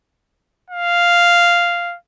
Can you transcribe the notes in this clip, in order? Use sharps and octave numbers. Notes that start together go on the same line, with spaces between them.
F5